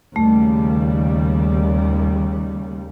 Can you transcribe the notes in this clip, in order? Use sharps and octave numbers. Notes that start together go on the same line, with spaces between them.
D#2 C#3 G3 A3